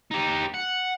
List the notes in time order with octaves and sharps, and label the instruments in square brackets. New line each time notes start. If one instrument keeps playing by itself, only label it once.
[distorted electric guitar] D#4 G4
F#5